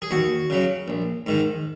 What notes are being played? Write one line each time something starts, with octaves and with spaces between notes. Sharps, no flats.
G#4
D#2 F#4
C#3 F#3
A#1
G#2 D#3